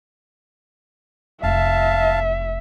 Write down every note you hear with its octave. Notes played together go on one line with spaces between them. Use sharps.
F1 E5 F5 A5